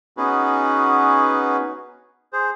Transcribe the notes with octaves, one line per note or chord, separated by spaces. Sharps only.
B3 C#4 D#4 F#4 G#4 B4
G#4 C5